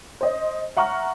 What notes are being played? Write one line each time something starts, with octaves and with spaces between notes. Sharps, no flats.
C5 D#5
E5 F#5 A#5 C#6 F6